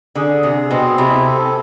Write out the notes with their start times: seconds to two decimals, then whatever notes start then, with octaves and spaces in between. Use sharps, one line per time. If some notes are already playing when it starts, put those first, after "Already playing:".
0.15 D3 G#4
0.43 C3 G#4
0.71 B2 C4
0.98 C3 E4
1.26 A4